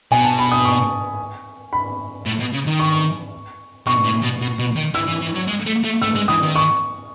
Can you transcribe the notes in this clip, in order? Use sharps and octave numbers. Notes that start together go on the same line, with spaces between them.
B2 G#5
A5
B5
D#6
C#6
B5
A2
B2
C#3
D#3
C#6
B2 C#6
A2
B2
B2
B2
D#3
E3 E6
E3
E3
F#3
G#3
A3
A3
A3 E6
G#3
E3 D#6
D#3
C#6